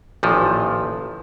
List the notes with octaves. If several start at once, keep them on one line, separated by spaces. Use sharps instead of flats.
A1 A#2 D#3 F3